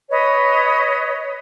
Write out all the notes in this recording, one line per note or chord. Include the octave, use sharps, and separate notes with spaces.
B4 C#5 D#5